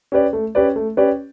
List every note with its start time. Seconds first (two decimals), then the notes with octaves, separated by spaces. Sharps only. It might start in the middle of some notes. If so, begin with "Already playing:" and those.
0.12 C#4 G4 B4 D5
0.33 A3
0.55 C#4 G4 B4 D5
0.76 A3
0.97 C#4 G4 B4 D5